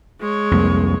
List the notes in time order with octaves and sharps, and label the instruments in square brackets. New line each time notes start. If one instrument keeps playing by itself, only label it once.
[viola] G#3 C#5
[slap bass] C2 F2 A#3